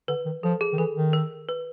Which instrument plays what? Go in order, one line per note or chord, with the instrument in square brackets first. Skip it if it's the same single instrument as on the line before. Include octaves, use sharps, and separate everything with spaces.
[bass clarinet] D3 [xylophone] B4
[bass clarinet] D#3
[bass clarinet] F3 [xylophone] A4
[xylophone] G#4
[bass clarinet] D#3
[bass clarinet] E3 [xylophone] A4
[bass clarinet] D#3
[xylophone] A#4
B4